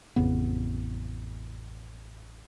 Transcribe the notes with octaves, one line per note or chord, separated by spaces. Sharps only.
A1 F2 C#3 B3